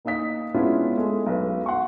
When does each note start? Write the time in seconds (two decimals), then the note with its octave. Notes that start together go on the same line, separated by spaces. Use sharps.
0.05 A#3 D#4 F5 D#6 B6
0.54 G#3 B3 C#4 D4 E4 F4
0.97 G#3 A3
1.26 B1 B4
1.66 F#5 C6 C#6